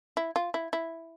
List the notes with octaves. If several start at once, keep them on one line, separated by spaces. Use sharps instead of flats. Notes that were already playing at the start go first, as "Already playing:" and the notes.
E4
F4
E4
E4